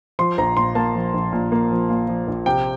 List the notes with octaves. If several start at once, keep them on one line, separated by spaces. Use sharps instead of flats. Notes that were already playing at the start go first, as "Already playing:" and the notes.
F3 C6
A#1 A#5
A#2 C6
A#3 A5
F3
A#1
A#2
A#3
F3
A#2
F3
A#1
C3 G5